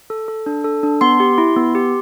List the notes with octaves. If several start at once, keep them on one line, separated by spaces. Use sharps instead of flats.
A4
A4
D4
A4
D4
B3 C6
G4
E4
B3
G4